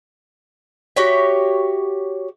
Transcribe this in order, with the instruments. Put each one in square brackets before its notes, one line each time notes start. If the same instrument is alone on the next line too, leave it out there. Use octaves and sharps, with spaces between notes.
[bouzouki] F#4 G4 C#5 E5